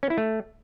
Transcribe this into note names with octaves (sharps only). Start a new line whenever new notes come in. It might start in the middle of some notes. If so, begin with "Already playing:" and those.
C#4
E4
A3